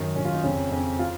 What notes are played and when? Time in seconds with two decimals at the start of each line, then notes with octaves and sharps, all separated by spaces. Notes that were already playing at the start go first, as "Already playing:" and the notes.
Already playing: F#2 D#3 A#4
0.15 F#2 D#3 C#4
0.25 F4
0.34 D#4
0.44 F2 C#3 C#4
0.71 F2 C#3 C#4
0.99 F4